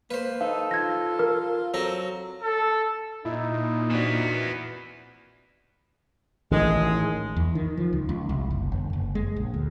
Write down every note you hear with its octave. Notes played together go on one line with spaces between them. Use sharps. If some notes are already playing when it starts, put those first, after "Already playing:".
A#3 B4 C5
D#4 A4 F5
F4 G#6 A#6
A#4
F#3 C4 A4 A#5
A4
A#2 D#4 E4
E3 B3 C4 D4 F#4
A1 D#3 G#3
E2
D#3
F3
C#2
C#2
C2
F#1
G1
F#1
G#3
A#1
D2